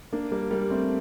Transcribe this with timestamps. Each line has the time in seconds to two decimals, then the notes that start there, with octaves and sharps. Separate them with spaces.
0.13 A#3 D4
0.31 G3 A#3
0.51 G3 A#3
0.70 A3 C4